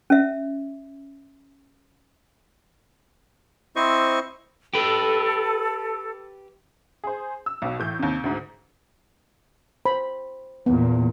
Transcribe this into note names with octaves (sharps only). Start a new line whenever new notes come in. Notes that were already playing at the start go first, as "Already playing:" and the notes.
C#4 E5
C4 E4 C5 D#5 C#6
G4 A4 B4
G#4 C5
E6
B1 B2
A2 E3 G6
D#2 C3
D2 G#2
C5 B5
E2 A#2 B3